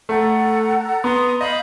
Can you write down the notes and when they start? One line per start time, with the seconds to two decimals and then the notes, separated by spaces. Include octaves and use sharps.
0.09 A3 A4 F#5 A#5
1.04 B3 A#5 C6 D#6
1.41 D#5 F5 B5 G6